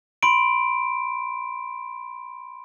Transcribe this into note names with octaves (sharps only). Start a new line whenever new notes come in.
B5 C6 D7